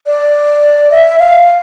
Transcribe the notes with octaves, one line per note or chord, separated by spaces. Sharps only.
D5
E5
F5